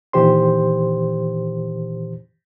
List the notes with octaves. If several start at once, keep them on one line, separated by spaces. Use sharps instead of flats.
A#2 D#3 E3 G4 C5 C6